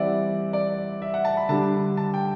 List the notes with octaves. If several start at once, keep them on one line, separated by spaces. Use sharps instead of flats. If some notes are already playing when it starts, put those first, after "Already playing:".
Already playing: E3 G3 C4 D5 E5 F#5
D5
E5
F#5
A5
B5
D3 G3 D4 A5
A5
G5